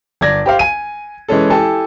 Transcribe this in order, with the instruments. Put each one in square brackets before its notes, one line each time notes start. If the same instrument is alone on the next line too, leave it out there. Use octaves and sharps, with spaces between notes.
[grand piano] G1 D5 G#6 A#6
G4 C5 F5
G#5 D#7
E3 G#3 C#4 A4
E4 G4 A4 G#5 A5